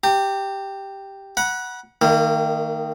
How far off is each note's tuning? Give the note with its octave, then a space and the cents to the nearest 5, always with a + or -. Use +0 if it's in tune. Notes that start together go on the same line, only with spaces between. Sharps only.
G4 +0 A#5 -40
F#5 +0 B5 -40
D#3 +0 A#3 -35